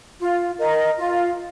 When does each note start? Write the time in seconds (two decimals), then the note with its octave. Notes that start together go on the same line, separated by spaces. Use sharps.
0.19 F4
0.59 A#4 D#5
0.98 F4